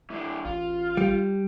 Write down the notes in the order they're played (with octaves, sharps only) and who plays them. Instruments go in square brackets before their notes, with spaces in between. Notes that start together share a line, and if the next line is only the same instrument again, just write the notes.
[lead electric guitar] E3 D4
[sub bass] A1 [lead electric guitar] F4
[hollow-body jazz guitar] G3